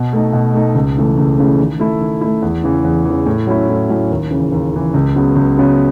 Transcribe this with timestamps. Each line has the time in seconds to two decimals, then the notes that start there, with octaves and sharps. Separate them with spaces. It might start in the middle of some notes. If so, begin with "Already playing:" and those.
Already playing: B2
0.13 A3 D#4
0.33 B2
0.54 A3 D#4
0.75 C#2
0.97 C#3 E3 A3
1.18 C#2
1.39 C#3 E3 A3
1.60 D#3
1.79 A3 E4
2.01 D#3
2.21 A3 E4
2.42 E2
2.64 C#3 E3
2.84 E2
3.05 C#3 E3
3.26 A2
3.47 F#3 C#4 E4
3.69 A2
3.89 F#3 C#4 E4
4.11 D#2
4.31 C#3 E3
4.52 D#2
4.74 C#3 E3
4.94 C#2
5.16 C#3 F#3 B3
5.36 C#2
5.58 C#3 F#3 B3